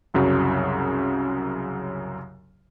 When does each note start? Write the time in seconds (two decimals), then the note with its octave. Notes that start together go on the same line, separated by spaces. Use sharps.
0.14 C2 F#2 C#3 F#3